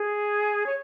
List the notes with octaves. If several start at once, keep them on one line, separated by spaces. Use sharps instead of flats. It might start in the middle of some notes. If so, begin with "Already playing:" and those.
Already playing: G#4
C#5